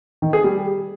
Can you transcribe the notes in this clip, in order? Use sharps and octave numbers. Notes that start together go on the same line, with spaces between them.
D#3
G#4
G3